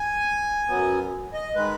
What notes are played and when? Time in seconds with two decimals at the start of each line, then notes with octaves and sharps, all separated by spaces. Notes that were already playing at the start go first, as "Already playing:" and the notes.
Already playing: G#5
0.68 F#2 F#3 B3
1.33 D#5
1.55 D#3 G#3 B4